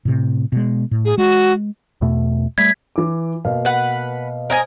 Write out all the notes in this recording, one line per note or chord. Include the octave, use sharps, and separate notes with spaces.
A2 C3
B2 G#3
A2
G#4
G#3 F#4
E2 B2 A3
G3 A3 G#6 B6
E3 D6
B2 A#3 F5
B4 F#5
A#4 C5 D#5 G#5